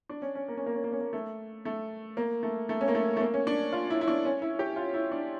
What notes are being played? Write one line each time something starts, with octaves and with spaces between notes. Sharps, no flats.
D4
C#4
C#4
A#3
C#4
A#3
C#4
A#3
C#4
A#3
A3
A3
A#3
A3
A3
C#4
A#3
A3
A3
A#3
C#4
D4
F4
E4
E4
D4
C#4
E4
G4
F4
E4
D4